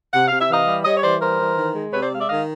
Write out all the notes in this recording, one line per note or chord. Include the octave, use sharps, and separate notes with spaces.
C3 F#5
C3 F5
E5
E3 D#5 F5
G3
G3 C#5 D#5
C#5
E3 C5 D5
G3 A#4 C5
E3
D#3
G#3
C3 B4 C#5
C5 D5
G#3 F5
D5 E5
D#3 D#5 F5